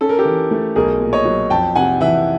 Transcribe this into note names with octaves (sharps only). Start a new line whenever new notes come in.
C#4 A4
A#4
G4 A4
E3
A3
B1 G#4 A#4
A#2
C#5 D#5
F#3
F2 G5 A5
C3 F#5 G#5
E3 E5 F#5